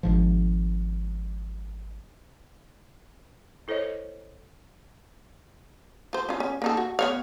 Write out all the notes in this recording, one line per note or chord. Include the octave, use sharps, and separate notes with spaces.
G#1 G#2 F3
E4 A4 C5 C#5 D#5
F4 C5
C#4 F4
C#4
A#3 D#4 A4
F#4
B3 C#5 F5